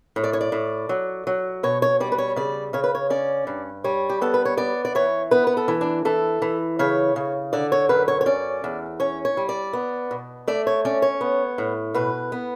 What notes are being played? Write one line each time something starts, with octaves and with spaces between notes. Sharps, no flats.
A2
D5
C#5
D5
A2
F#3
F#3
B2 C#5
C#5
G3 D5
B4
C#5
C#3 D5
C#3 C#5
B4
C#5
C#4 D5
G2
G3 C#5
G4
B3 A4
B4
C#5
B3 D5
D5
E3 C#5
B3 B4
B4
A4
E3
D4
E3 A4
E3
C#3 C#5
C#3
D3 D5
C#5
F#2 B4
C#5
C#5
C#4 D5
E2
C#4 C#5
C#5
G3
D5
B3
B2
A3 D5
C#5
C#4 D5
C#5
B3
A2
B2 B4
B3